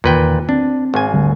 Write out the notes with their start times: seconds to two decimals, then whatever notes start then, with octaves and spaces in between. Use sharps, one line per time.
0.04 E2 A#2 D#3 B4 G5
0.49 C4 D4
0.94 G#1 G#5
1.14 D2 D3 G3